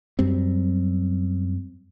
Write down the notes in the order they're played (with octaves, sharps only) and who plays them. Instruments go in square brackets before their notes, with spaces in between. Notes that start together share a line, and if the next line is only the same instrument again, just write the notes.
[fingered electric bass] F#2 F#3 G3 C4